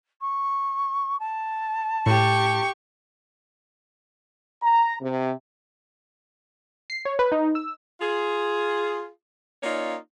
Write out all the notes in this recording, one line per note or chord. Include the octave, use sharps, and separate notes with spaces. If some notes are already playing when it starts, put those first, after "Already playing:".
C#6
A5
A2 G4 C#6
A#5
C3
C7
C#5
B4
D#4
E6
F4 G#4
A#3 C#4 D#4 F4 C#5 D5